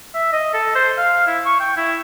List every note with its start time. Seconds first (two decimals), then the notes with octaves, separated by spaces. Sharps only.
0.14 E5
0.33 D#5
0.54 A4
0.75 C5
0.98 F5
1.27 E4
1.46 C#6
1.60 G5
1.77 E4